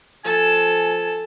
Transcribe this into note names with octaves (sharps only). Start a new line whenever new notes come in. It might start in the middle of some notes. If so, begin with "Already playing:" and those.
F3 A4 G#5 A5